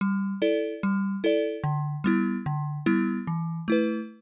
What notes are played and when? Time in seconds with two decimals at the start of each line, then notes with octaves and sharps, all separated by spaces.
0.01 G3
0.42 E4 A4 D5
0.83 G3
1.24 E4 A4 D5
1.64 D3
2.04 G3 B3 E4
2.46 D3
2.86 G3 B3 E4
3.27 E3
3.68 A3 E4 B4